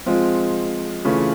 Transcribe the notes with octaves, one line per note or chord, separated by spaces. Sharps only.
F3 G#3 C4 F4
C#3 E3 A3 C#4 F4